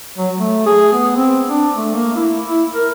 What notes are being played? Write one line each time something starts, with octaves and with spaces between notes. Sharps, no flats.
F#3
A3
G#4
B3
C4
D4
A3
A#3
E4
E4
A#4